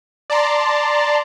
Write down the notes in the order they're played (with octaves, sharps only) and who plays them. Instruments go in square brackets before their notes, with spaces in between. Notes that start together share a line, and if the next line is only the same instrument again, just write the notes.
[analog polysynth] D5 A5 A#5 C6